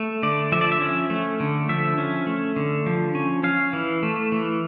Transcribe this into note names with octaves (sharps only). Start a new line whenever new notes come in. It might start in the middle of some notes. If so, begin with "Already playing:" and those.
Already playing: A3
D3 D5
F3 E5
D5
E5
C#4
A3
D3
F3 E5
C#4
A3
D3
F3
C#4
C#4 F5
E3
A3
E3